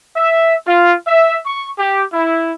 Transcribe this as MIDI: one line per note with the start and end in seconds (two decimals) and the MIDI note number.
0.16 0.54 76
0.66 0.93 65
1.07 1.39 76
1.46 1.69 85
1.79 2.02 67
2.13 2.53 64